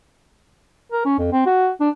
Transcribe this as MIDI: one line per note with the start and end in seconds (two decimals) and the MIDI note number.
0.92 1.04 70
1.05 1.17 61
1.19 1.29 41
1.32 1.43 60
1.46 1.70 66
1.81 1.90 62